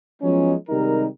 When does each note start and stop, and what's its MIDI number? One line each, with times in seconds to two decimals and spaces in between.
0.22 0.54 53
0.22 0.54 54
0.22 0.54 56
0.22 0.54 59
0.22 0.54 61
0.22 0.54 63
0.69 1.05 48
0.69 1.05 51
0.69 1.05 55
0.69 1.05 56
0.69 1.05 63
0.69 1.05 70